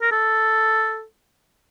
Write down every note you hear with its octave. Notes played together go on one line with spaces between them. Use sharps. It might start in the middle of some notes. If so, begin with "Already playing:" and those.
A#4
A4